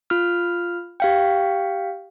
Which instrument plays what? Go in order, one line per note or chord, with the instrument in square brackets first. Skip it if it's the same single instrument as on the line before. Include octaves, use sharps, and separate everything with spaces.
[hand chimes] F4 F6
G4 F5 G5